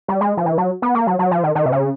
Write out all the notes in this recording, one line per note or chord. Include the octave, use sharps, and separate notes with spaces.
G3
G#3
F3
E3
F#3
B3
A#3
F#3
F#3
F3
D#3
D#3
C3
C#3